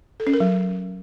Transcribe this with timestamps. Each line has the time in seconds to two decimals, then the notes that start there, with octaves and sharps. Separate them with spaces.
0.20 A4
0.27 C#4
0.33 A#4
0.40 F#3